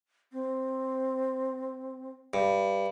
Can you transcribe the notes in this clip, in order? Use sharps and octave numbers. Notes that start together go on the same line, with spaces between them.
C4
G2